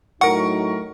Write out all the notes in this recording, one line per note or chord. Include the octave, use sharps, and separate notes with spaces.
A2 F#3 D#4 A#4 F#5 C#6